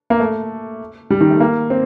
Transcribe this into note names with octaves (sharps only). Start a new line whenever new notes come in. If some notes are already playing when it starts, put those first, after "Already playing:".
A#3
A3
G3
D#3
A3
A#3
C4